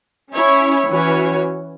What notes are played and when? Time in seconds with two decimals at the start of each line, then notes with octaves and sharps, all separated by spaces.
0.32 C#4 E4 C#5
0.89 E3 C#4 F#4 C#5